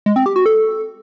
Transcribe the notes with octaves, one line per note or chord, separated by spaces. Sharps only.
G#3
C4
G4
F#4
A4